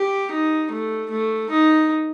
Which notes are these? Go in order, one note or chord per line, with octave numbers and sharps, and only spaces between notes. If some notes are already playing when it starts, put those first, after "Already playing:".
Already playing: G4
D#4
A3
A3
D#4